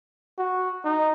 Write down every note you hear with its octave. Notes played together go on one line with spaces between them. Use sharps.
F#4
D#4